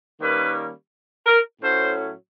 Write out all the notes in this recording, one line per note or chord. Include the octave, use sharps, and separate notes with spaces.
D#3 G3 A#3 C#4 B4
A#4
A2 F#3 A3 C#4 C5